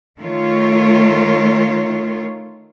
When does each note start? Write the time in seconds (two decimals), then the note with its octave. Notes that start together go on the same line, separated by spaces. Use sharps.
0.20 D#3 A3 F4 C#5